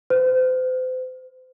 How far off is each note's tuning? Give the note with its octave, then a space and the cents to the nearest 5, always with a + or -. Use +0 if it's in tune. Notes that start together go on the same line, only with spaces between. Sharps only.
C5 -40